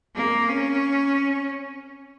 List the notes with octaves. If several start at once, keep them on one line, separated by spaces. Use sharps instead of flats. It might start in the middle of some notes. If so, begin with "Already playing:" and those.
A#3
C#4